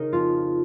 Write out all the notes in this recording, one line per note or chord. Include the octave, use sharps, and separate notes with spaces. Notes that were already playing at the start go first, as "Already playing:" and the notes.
Already playing: C#3 D#4 G#4 A#4
F2 F4